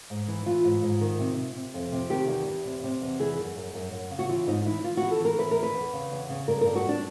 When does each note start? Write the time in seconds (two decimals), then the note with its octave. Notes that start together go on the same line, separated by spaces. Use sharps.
0.10 G#2
0.28 E3
0.46 E3 F4
0.65 G#2
0.82 G#2
1.01 D#3
1.19 C3
1.37 C3
1.56 C3
1.74 F2
1.92 C3
2.10 D#3 G4
2.28 E2
2.47 E2
2.65 C3
2.83 C3
3.01 E2
3.19 E3 G#4
3.38 F#2
3.56 F#2
3.74 F#2
3.93 F#2
4.11 C#3
4.19 F#4
4.29 E3 F4
4.47 G#2 D#4
4.66 E3 E4
4.84 E3 F4
4.97 F#4
5.02 E3
5.11 A4
5.20 E3 A#4
5.38 E3 B4
5.51 A#4
5.57 E2
5.63 B4
5.75 E2
5.93 C#3
6.11 E2
6.29 C#3
6.48 G2 A#4
6.61 A#4
6.66 G2
6.75 F#4
6.85 G2 D4